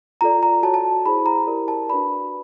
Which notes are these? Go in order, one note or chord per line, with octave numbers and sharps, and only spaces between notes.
F4 A4 D5 A#5
A#5
F#4 A4 C#5 A5
A5
E4 G#4 C5 B5
A#5
E4 G4 A#4 D5
A5
D4 F#4 B4 D5 B5